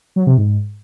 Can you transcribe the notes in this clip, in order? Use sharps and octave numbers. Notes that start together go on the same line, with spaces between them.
F#3
C3
G#2